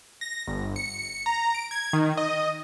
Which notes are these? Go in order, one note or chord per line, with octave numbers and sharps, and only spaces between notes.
A#6
G1
C#7
A#5
D7
G#6
D#3
D#5